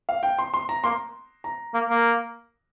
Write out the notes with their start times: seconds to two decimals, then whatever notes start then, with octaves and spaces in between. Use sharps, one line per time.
0.09 F5
0.23 G5
0.39 C6
0.54 C6
0.69 A#5
0.84 A#3 C6
1.44 A#5
1.74 A#3
1.89 A#3